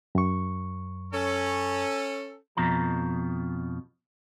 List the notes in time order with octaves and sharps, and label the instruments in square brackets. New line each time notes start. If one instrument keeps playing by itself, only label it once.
[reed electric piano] F#2 C#6
[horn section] C#4 A4
[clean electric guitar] F2 B2 F3 A#5